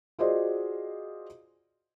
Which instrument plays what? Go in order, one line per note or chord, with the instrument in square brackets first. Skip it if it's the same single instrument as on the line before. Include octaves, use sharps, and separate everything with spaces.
[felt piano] F4 F#4 G#4 C5 D5 D#5